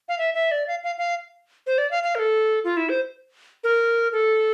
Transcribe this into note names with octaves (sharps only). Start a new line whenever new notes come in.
F5
E5
E5
D5
F5
F5
F5
C5
D5
F5
F5
A#4
A4
F4
E4
C5
A#4
A4